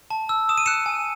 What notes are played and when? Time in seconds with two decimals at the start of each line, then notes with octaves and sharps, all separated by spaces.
0.10 A5
0.29 E6
0.49 D#6 E7
0.58 D#7
0.66 F#6 C#7 E7
0.86 G#5